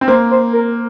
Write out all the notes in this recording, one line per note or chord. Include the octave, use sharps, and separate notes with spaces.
C4
A#3 C5
C5
A#4